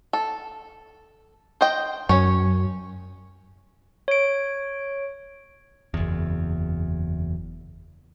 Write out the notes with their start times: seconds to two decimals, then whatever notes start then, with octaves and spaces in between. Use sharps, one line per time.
0.13 A4
1.61 C5 D#5 G5
2.09 F#2 C#4 C#5
4.08 C#5 D7
5.94 F#1 E2